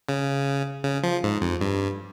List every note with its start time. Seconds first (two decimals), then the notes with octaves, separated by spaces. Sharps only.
0.09 C#3
0.84 C#3
1.03 F3
1.23 G#2
1.41 F2
1.61 G2